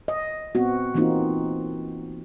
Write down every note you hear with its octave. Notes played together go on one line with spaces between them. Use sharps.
D#5
A#2 B3 C4 F#4
E3 A#3 C4 D#4 F4 F#4